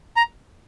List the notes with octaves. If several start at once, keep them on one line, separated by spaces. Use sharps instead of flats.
A#5